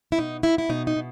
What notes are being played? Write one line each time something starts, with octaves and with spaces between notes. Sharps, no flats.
E4
B2 D#4
B2 E4
E4
B2 D#4
D#4
B2